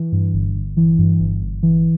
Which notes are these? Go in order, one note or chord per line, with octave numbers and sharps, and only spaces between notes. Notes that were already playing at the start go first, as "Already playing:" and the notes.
Already playing: E3
G2
G1
G1
E3
G2
G1
G1
E3